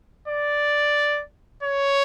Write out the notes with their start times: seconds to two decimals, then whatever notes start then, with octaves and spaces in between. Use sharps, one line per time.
0.28 D5
1.63 C#5